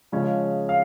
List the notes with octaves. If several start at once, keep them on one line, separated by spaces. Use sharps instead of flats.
C#3 F3 G#3 C#4
F5